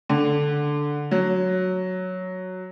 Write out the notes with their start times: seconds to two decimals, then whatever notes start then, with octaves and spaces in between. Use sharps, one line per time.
0.09 D3
1.11 F#3